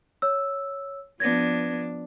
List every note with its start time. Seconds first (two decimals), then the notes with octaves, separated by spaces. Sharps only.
0.22 C#5 E6
1.20 F3 B3 D4 G#6 A#6